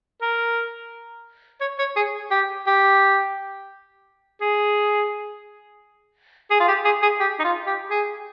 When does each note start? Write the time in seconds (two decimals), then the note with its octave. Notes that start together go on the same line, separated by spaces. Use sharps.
0.22 A#4
1.61 C#5
1.79 C#5
1.97 G#4
2.31 G4
2.67 G4
4.41 G#4
6.51 G#4
6.60 F4
6.68 G4
6.85 G#4
7.02 G#4
7.20 G4
7.40 D#4
7.44 F4
7.67 G4
7.91 G#4